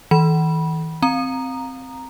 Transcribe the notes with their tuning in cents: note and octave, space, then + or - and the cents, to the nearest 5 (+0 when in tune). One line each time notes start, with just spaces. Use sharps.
E3 -40 B5 -20
C4 +0 A#5 +0